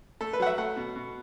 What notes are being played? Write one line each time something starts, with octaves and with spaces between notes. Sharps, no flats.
A3 A4
B4
F#3 F#5
E5
A3 F#5
B2
B2